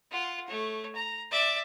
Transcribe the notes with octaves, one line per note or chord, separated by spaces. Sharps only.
F4 F#5
A3 C#5
A#5
D5 E5